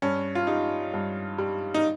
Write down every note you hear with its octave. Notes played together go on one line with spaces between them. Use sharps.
G2 C#4
F4
G3 D#4
G2
G3
D#4